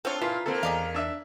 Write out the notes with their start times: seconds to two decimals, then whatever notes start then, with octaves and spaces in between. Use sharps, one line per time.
0.05 C4 D4 F4 A4 C#5
0.21 A#2 E3 F4 C6 B6
0.46 D#3 A#3 C4 A4
0.63 E2 G#4 D5 D#5 F5 B6
0.94 D4 E5